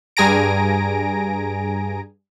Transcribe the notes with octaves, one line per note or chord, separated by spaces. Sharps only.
G2 G#4 G#5 A#5 A#6 D7